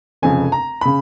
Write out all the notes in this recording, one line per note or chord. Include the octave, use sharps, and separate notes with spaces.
F1 F2 C#3 G#5
A#5
C#3 B5